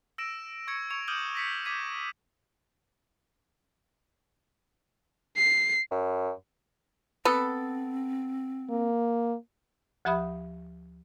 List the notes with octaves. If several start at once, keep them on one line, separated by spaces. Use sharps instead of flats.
E6 A#6 D7 E7
C#6 G#6 C#7
C#6 G#6 C#7 F7
D6 D#6 F6 G6 D#7 F#7
A#6 B6 C#7
D6 G6 G#6 B6 D#7
C7
F#2
B3 C4 A4
A#3
D2 F3 G4 E5 B5 D#6